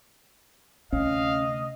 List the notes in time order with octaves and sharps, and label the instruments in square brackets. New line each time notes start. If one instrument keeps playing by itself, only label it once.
[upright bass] D2 C3 [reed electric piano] C#4 [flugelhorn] D#5 [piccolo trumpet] F5